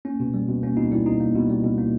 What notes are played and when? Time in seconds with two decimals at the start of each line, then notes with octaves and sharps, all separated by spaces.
0.05 A#3 C#4
0.20 B2
0.34 G3
0.48 B2
0.63 A#3 C#4
0.77 B2 D#4
0.92 G3 E4
1.06 B2 D#4
1.20 A#3
1.35 B2
1.49 G3
1.64 B2
1.78 A#3